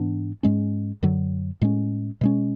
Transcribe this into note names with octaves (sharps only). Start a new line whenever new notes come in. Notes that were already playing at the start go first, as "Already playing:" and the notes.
Already playing: G#2 E3 B3 D4
G#2 G#3 C#4
F#2 D3 F#3
A2 G#3 C#4
B2 G#3 C#4